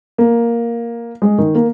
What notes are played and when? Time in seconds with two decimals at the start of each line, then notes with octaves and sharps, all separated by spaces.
0.18 A#3
1.22 G#3
1.38 D#3
1.55 A#3